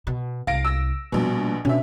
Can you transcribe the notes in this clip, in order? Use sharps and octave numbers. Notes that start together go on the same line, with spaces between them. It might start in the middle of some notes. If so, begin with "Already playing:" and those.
B2
C2 F5 A#6 D7
E6 A#6
A#1 B2 G3
B2 C#4 D4 E5